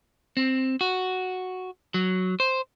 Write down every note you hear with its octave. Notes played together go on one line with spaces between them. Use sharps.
C4
F#4
F#3
C5